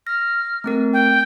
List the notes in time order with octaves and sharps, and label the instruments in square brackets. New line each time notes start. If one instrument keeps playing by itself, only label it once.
[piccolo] F6 [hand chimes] A#6
[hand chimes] A3 C4 A#4
[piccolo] G5